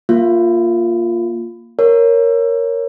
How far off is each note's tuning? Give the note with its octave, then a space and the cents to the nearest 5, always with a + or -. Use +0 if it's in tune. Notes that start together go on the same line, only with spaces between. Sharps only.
A#3 +0 F4 +0
A#4 +0 C#5 +0